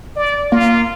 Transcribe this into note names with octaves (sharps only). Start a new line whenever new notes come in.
D5
A#3 F4